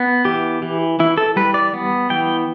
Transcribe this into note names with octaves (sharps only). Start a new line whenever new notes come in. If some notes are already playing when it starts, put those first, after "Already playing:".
Already playing: B3
E3 G4
E3
E3 E4
A4
G3 B4
D5
B3
E3 G5